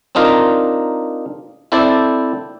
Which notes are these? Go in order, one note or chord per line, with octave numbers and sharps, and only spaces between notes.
C4 D4 D#4 F4 A#4
C4 E4 A4 C5 D5